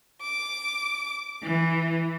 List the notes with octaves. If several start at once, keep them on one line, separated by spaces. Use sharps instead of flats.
D6
E3